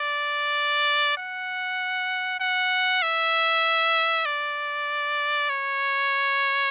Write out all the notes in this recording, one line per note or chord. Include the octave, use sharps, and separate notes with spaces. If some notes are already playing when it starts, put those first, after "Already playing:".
Already playing: D5
F#5
F#5
E5
D5
C#5